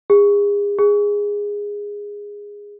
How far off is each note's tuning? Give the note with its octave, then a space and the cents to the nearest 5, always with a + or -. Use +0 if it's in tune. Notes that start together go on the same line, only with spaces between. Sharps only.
G#4 -35
G#4 -15